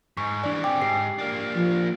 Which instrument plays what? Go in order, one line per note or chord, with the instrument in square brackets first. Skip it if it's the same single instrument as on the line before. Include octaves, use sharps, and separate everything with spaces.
[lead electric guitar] G#2 [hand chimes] C#6
[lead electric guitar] E3 G3 [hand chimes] D4 D5
[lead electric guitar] C4 G#4 [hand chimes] G5 D6
[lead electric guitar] G#2 [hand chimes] G4 C7
[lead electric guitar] A#3 D4
[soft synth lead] F3